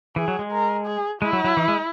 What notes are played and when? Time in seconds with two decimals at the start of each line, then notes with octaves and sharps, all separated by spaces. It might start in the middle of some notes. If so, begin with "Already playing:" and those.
0.16 E3 G#4
0.28 F#3
0.39 G#3
0.52 A#4
0.86 G#4
1.21 G#3 E4
1.33 F#3
1.44 F#3
1.57 E3
1.68 G#3